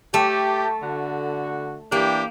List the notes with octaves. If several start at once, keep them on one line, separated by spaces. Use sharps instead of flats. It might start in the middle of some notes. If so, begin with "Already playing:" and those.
A3 G4
D3 F#4
E3 A#3 D4 G4